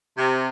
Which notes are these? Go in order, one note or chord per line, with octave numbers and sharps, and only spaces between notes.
C3